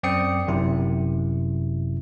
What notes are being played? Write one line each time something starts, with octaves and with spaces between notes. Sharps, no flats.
F#2 C4 D5 G5 D#6 C#7
G1 F#2 C3 E4